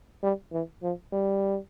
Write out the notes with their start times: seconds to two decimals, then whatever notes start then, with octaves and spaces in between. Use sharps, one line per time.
0.23 G3
0.52 E3
0.83 F3
1.13 G3